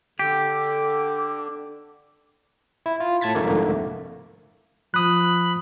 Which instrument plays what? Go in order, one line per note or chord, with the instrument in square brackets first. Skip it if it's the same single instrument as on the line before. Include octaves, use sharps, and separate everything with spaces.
[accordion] D3 [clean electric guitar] G4 [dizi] D6
[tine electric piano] E4
F4
A2 A5 G#6 A6 B6
C2 F2 G#2 D3 A3 A#3
[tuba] F3 [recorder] B5 [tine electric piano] D#6 F#6